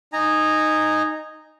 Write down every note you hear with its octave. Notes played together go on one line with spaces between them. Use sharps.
D#4 D#5 G#5 A#5